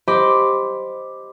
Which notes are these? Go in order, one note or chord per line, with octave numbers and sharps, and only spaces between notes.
G4 C5 D#5 B5 C6 D6